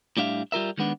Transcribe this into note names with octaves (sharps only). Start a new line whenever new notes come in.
A2 G3 D4 E5 F5
G3 F4 A#4 E5
D#3 G#3 B3 D4